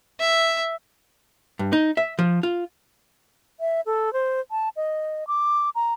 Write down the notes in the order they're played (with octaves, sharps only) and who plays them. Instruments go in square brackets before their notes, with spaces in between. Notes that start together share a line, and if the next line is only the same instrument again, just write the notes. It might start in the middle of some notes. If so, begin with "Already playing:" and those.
[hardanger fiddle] E5
[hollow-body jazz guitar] G2
D#4
E5
F3
F4
[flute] E5
A4
C5
A5
D#5
D6
A#5